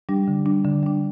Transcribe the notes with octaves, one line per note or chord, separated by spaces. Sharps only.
G3 D4 G4
D3
G3 D4
D3
G3 D4